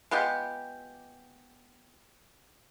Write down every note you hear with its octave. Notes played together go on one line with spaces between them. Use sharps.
G#3 B3 F4 G4